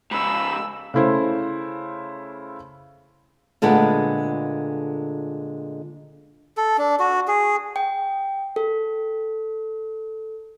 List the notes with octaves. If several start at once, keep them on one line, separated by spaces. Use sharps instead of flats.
G#2 C#3 B5 E6
C#3 A3 E4 C5
A#2 D3 G#3 A3 B3
A4
D4
F#4
G#4
G5
A4